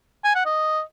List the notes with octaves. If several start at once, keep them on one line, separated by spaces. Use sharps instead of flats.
G#5
F#5
D#5